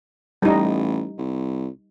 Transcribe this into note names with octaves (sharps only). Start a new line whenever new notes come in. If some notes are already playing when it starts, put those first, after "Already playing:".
A1 G3 D#4
C2